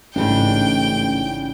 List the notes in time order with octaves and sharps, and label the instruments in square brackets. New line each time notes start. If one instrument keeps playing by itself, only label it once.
[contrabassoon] A1 [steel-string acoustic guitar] G#2 C#3 D4 [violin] G5